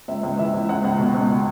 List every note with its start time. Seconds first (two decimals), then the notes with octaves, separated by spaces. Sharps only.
0.08 C#2 E5
0.23 C#2
0.38 E3 E5
0.54 C#2
0.69 C#2 F#5
0.84 C#2
0.99 B2
1.14 C#2